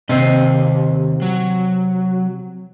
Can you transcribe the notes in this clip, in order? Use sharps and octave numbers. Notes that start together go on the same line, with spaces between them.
D#2 C3 C4 D#5
F#3